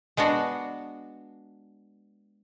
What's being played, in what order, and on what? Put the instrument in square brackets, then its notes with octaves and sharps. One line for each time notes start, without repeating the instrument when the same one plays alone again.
[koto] G#3 B3 D4 F#4